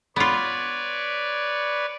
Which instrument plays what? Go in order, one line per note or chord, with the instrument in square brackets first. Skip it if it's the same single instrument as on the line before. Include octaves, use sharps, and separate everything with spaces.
[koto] B3 F4 [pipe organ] B4 C#5 D5